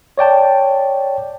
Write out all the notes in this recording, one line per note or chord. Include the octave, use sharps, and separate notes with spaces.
C#5 D5 G5 A5